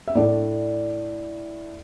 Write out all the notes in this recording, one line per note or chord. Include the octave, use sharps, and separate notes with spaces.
E5
A2 A3 D4 D5